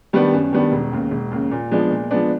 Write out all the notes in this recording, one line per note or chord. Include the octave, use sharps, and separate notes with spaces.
D#3 G3 B3 D4
F#2
D#3 G3 B3 D4
E1
D#2 C#3
E1
D#2 C#3
A#2
F3 G#3 B3 D4
A#2
F3 G#3 B3 D4